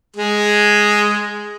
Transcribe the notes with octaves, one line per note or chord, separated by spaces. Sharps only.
G#3 G#4